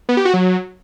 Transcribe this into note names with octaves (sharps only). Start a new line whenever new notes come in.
B3
G4
F#4
F#3